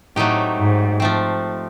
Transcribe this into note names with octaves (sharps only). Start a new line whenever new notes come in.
A2 F#3 A3 C4 D#4 G4
G#2
F3 A3 C4